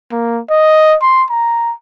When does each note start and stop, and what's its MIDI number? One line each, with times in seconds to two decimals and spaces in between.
0.12 0.41 58
0.50 0.96 75
1.02 1.24 84
1.30 1.73 82